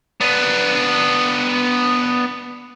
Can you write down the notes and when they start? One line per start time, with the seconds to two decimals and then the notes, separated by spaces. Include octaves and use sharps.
0.21 B3 D4